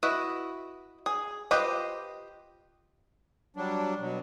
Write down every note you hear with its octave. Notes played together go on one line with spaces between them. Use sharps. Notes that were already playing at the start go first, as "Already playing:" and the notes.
E4 F#4 B4 D#5
G#4
F4 G4 B4 C5 D#5
F#3 G3 D4
B2 F#3